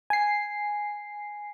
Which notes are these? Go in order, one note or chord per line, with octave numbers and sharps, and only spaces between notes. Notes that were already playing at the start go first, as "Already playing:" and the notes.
G#5 C7